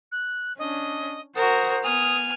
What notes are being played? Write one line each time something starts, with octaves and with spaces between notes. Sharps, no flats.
F#6
C#4 D4 D#5
F#4 A#4 C5 F#5 D#6
B3 G#5 D#6 F6